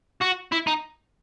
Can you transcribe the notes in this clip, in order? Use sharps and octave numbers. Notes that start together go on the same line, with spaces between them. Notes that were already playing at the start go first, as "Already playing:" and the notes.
F#4
E4
D#4